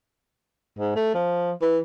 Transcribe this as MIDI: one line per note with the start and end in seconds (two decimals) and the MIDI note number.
0.79 0.95 44
0.96 1.13 57
1.14 1.52 53
1.61 1.79 52